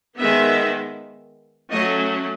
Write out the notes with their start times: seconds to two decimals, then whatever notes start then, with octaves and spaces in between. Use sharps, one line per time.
0.16 D#3 G#3 B3 E5
1.70 F#3 A3 C#4 D#5